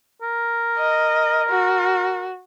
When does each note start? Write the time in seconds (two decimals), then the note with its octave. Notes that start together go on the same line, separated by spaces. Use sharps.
0.22 A#4
0.78 D#5
1.49 F#4